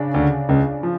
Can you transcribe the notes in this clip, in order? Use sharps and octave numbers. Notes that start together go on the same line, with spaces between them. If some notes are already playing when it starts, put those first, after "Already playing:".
Already playing: C#3 D4
D2 D3
C#2 C#3
F3